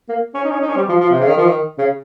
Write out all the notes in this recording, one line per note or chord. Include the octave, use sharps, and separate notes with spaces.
A#3
C#4
D#4
C#4
D#4
C#4
G3
F3
F3
C3
C#3
D#3
F3
D#3
C#3